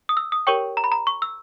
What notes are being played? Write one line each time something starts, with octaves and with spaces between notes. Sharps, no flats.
D#6
E6
D#6
G4 A#4 C#5 G5 C#6
A#5
B5
A#5
C#6
E6